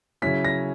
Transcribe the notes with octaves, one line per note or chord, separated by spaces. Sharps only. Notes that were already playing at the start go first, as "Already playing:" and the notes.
C#3 F#3 C#4 E4 B6
A#6